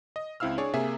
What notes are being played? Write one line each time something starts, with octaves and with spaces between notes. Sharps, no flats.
D#5
C#2 C4 E4 F5 E6 F6
D4 G#4 C#5 D5
C3 A#3 G#4 E5